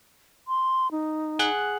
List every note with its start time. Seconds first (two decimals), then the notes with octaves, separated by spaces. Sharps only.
0.48 C6
0.91 D#4
1.39 G#4 F#5 F#6